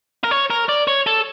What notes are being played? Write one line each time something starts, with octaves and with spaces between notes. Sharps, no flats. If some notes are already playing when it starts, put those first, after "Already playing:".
A#4
C#5
A#4
D5
C#5
A4